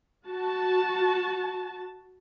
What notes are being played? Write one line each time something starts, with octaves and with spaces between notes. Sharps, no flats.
F#4 A5